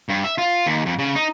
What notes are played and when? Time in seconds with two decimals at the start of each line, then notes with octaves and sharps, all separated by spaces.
0.09 G2
0.24 E5
0.38 F4
0.66 D#2
0.86 F2
0.99 C#3
1.15 D#4